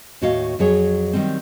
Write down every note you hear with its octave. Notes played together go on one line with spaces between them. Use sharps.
D#2 A2 F#4 C#5 D#5 F5
F2 F#3 G#4 C#5
D#3 F#3 G3 C4